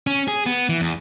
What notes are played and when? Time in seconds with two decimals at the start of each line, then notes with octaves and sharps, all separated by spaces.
0.07 C#4
0.28 G#4
0.46 B3
0.69 E3
0.81 E2